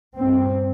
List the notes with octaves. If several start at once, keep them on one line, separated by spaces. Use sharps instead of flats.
G2 C4